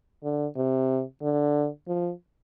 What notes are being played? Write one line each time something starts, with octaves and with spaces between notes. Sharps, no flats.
D3
C3
D3
F3